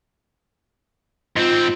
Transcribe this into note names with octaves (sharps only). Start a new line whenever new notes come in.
G#2 C4 F4